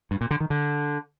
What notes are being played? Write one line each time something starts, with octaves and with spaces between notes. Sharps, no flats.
G2
A#2
D3
D#3
D3